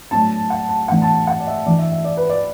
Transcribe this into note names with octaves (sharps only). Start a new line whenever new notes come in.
A2 F#3 B3 D4 A5
F#5
A5
A2 E3 B3 D4 F#5
A5
A5
F#5
D5
E5
E3 D4 D5
E5
E5
D5
B4
D5